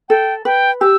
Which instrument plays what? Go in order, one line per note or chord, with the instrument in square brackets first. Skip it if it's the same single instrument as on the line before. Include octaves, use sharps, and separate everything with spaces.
[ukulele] A4 [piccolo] G5
[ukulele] B4 [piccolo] G5
[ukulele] G4 [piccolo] E6